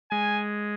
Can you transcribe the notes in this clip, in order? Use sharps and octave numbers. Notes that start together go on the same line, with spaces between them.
G#3 G#5